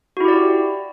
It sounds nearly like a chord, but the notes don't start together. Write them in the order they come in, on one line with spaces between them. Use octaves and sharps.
F#4 E4 G4 D5